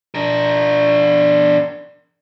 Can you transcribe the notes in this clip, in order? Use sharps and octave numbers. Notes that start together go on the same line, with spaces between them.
D4 A#4